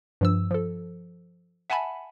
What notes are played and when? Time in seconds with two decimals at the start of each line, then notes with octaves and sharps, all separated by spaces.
0.21 G2 F3 E6
0.51 F3 A4
1.70 E5 F#5 G#5 A5 B5